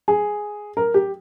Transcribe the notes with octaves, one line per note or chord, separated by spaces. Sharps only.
G#4
A#4
G4